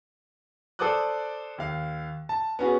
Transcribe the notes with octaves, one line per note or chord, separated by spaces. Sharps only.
A4 C5 D5 D6 D#6 F#6
D#2 F5
A5
B3 C#4 F#4 G#4